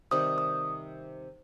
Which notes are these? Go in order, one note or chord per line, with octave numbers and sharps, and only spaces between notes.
C3 D#3 G3 D#6
D#6